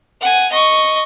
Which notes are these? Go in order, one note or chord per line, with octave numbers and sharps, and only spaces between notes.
F#5 G#5
D#5 C#6